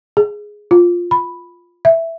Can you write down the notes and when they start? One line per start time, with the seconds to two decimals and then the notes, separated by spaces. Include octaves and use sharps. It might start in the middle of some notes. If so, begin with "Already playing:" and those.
0.17 G#4
0.71 F4
1.11 B5
1.85 E5